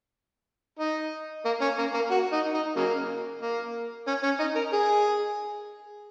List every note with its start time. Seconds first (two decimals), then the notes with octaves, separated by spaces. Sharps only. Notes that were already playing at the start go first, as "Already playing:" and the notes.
0.79 D#4
1.45 A#3
1.61 C#4
1.78 A#3
1.94 A#3
2.11 F#4
2.32 D#4
2.54 D#4
2.76 C#3 F#3 A#3
3.42 A#3
4.07 C#4
4.23 C#4
4.39 D#4
4.56 A#4
4.73 G#4